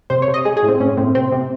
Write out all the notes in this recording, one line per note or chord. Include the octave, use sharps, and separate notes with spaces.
C3 C5
C#5
C3
D#5
G#3 G#4
G#4
A2
C4
A2 C#4
A2 C4
C3 C4
C3